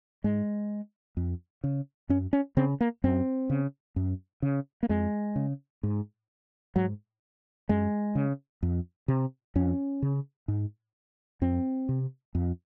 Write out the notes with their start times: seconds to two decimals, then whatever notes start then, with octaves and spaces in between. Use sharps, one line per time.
0.24 G#2 G#3
1.17 F2
1.64 C#3
2.09 F#2 C#4
2.33 C#4
2.57 C#3 C4
2.81 A#3
3.04 F#2 C4
3.50 C#3
3.96 F#2
4.42 C#3
4.83 A#3
4.89 F2 G#3
5.36 C#3
5.83 G#2
6.76 G#2 F#3
7.69 F#2 G#3
8.15 C#3
8.63 F2
9.08 C3
9.56 F2 C#4
10.02 C#3
10.48 G#2
11.42 F2 C4
11.89 C3
12.35 F2